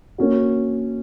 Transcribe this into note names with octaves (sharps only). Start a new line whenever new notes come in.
A#3 C#4 F#4